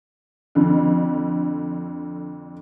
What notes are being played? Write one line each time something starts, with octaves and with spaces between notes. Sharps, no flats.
F2 D3